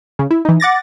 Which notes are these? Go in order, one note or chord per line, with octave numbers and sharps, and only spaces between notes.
C#3
E4
E3 D#4
F#5 D6 A6 A#6